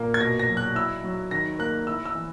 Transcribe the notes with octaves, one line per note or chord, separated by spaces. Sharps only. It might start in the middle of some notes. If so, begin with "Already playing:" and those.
Already playing: A#2 A#3
G#6
B2 A#6
A#6
F#3
F#6
E4 E6
F#3
D#3 A#6
A#3 F#6
E4 E6
E6
E3